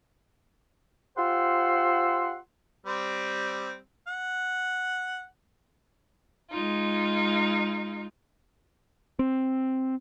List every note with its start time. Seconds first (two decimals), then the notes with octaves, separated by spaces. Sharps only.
1.17 F4 G4 C5 F#5 C6 E6
2.86 G3 C4
4.07 F#5
6.52 G#3 D#4 F4
9.19 C4